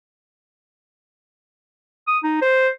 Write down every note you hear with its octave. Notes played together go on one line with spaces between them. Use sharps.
D#6
D#4
C5